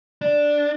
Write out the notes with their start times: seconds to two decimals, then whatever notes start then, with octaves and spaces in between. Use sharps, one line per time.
0.21 D4